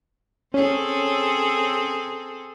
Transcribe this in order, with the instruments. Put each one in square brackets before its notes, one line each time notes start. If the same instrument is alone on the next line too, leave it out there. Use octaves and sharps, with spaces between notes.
[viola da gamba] C4 G#4 A4 [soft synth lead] C#4